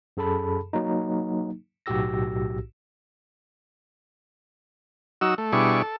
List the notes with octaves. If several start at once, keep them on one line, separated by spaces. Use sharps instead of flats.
F#2 G#4 A4 A5 B5
F#3 A#3 D#4
B1 A2 F#4 G4 E6 A#6
F#3 D#4 F#4 E6
A3
B2 G3 D4 E4 G#4 C#6
A4